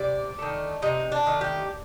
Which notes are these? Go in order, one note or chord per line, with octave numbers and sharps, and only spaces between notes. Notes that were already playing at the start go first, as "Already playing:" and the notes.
Already playing: C3 D5
D#3 A3
C3 D#4
D4
D#3 A3
G4